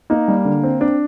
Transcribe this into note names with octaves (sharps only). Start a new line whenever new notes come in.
A#3 D#4
G3
D3
C4
C4 D4